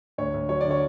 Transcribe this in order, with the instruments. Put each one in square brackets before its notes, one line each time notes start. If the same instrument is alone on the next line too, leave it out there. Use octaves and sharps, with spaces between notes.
[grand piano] D2 C#5
D2
F#3 C#5
D3 D5
C#5